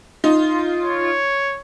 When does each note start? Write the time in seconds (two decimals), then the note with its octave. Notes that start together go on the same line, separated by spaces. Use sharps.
0.24 D#4 F4
0.83 C#5